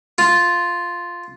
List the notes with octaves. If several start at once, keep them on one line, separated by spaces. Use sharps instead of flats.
F4